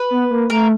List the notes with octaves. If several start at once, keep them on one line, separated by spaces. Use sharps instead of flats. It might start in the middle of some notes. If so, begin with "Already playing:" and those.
Already playing: B4
B3
A#3
A3 A#4